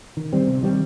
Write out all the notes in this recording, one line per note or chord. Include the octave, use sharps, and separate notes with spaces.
D#3
G3 C4
C3
D#3 G3 C4